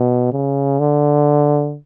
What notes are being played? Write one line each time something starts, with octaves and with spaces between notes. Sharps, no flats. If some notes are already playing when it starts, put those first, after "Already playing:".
Already playing: B2
C#3
D3